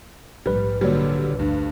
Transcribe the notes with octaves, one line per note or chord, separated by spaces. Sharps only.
A#1 G#2 G3 B4
A#2 D3 F#3 G3
D2 G2